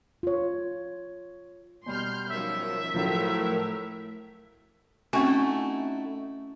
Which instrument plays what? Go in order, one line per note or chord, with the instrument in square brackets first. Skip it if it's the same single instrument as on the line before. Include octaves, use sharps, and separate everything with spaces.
[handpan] F4 C#5
[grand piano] B2 G3 [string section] C6 F6 G6
[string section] F#2 D#3 F3 [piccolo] E5
[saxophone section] A2 [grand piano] F3 F#3 [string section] A3 A#4
[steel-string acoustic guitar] A3 D#4 E4 [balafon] C4 G#5 [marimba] C#4 [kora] F#4